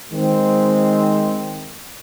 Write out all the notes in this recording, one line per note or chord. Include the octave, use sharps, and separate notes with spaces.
D#3 G#3 C4